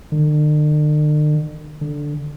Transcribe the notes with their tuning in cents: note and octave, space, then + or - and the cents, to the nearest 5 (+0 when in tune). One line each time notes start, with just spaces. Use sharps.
D3 +45
D3 +0